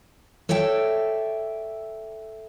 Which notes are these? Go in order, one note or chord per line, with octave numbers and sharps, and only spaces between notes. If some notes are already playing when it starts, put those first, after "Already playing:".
A4 C#5 D5 E5 G5